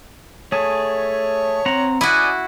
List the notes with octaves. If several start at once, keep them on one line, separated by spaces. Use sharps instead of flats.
A3 G#4 C#5
C4 F#5 A#5
E4 F#4 D5 D#5 G#5